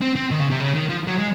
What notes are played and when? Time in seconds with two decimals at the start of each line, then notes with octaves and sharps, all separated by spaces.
0.01 C4
0.15 C4
0.31 D#3
0.40 C#3
0.50 C3
0.60 C#3
0.74 D#3
0.89 F3
1.07 F#3
1.18 G#3